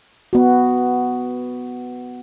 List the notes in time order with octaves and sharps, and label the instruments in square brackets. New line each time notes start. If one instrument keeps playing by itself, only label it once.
[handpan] B3 F#4